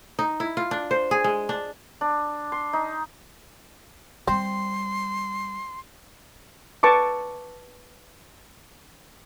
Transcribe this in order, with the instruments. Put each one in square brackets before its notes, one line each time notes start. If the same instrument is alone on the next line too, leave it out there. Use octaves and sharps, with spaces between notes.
[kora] D#4
E4
F4
D4
C5
G#4
G#3
D4
[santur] D4
C6
D#4
[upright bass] G3 [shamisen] C4 [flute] C6
[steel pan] B4 A5 C#6 D6